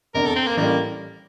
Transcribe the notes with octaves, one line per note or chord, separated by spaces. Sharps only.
F1 E2 D3 A#4
A4
C4
A#3
A1 A2 E3 G3 A#3